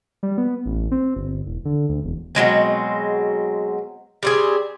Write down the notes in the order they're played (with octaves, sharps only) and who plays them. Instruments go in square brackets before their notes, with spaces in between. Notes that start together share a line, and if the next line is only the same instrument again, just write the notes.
[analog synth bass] G3
B3
A1
C4
G1
E1
D3
D2
E1
[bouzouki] B2 F#3 G#3 C4
G3 C4 G#4